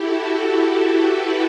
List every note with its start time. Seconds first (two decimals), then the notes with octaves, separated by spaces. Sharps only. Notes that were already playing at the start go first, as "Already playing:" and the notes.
Already playing: E4 F#4 G4 A4
0.20 F#4 A4
0.48 F#4 A4
0.91 G4 B4